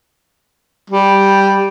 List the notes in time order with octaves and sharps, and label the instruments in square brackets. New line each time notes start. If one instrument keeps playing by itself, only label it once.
[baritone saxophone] G3